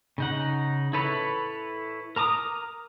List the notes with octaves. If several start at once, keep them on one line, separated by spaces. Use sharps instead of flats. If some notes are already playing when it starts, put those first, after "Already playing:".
C#3 D#4 F#5
E4 A4 B4 C#5
A#4 A#5 D6 D#6